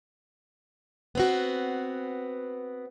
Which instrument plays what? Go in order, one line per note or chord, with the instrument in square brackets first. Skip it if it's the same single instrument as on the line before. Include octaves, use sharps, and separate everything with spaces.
[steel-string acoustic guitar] B3 C4 F#4